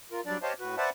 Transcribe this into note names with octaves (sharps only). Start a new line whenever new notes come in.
F4 A#4
F#3 G3 D4 D5
G4 C5 C#5 D#5 F5 A5
A2 F#4 B4
B4 C5 D5 E5 F#5 A5